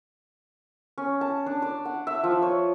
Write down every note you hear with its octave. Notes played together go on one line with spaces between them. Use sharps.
C#4
A5
D4
D5
F#5
E5
F3
C#5